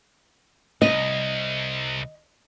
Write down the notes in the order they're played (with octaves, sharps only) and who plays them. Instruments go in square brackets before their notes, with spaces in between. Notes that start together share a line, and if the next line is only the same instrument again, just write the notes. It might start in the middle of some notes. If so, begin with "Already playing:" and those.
[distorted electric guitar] C2 [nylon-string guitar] D#5